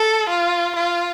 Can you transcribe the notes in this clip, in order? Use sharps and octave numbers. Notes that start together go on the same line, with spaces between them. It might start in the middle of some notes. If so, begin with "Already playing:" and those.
Already playing: A4
F4
F4